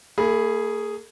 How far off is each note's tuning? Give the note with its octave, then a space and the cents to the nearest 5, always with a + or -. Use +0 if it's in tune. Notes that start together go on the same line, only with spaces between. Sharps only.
A#3 -45 G#4 +0 B5 +0